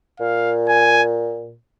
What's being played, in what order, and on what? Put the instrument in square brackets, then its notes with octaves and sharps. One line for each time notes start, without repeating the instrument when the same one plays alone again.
[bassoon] A#2 [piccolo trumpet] F5
[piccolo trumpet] G#5